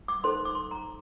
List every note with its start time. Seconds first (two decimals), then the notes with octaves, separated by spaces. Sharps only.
0.08 D6
0.24 D#4 A4 C5 C6
0.45 D6
0.55 C6
0.71 A#5